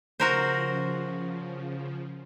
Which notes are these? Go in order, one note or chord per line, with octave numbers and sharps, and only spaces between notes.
C#3 F3 F#4 A#4 C5